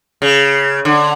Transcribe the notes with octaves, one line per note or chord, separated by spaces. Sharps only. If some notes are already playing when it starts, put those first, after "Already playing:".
C#3
D3